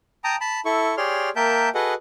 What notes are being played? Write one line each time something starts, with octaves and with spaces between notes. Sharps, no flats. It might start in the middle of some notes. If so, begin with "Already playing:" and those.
G5 A5 A#5 D#6
A5 B5
E4 A4 C#6
G4 G#4 C#5 D5 C6 F6
A#3 A#4 E5 G5 A5 G6
F#4 G#4 A4 B4 D#5 F#5